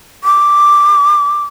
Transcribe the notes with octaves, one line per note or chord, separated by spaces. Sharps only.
D6